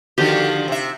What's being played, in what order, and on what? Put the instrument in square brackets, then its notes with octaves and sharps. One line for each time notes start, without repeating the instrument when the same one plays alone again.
[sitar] D3 D#3 F3 [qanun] F#4 G4
[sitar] C3 E5